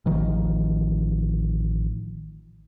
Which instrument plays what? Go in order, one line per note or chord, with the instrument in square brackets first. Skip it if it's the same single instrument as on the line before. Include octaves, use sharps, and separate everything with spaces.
[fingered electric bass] A1 D#3 F3